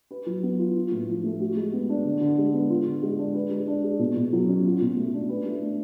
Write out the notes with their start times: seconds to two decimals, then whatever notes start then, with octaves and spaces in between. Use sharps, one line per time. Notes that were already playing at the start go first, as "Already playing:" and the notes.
0.11 B4
0.26 F#3
0.43 B3
0.59 F4
0.76 F4
0.92 A2
1.08 F3
1.24 A3
1.40 F#4
1.57 G#3
1.73 B3
1.89 D4
2.05 D3
2.21 D3
2.38 G#3
2.53 B3
2.70 F4
2.86 D3
3.03 G#3
3.19 D4
3.35 B4
3.51 G#3
3.68 D4
3.83 G#4
3.99 B2
4.16 B2
4.33 F#3
4.48 C#4
4.65 F4
4.81 B2
4.97 A3
5.13 D4
5.29 B4
5.46 A3
5.62 D4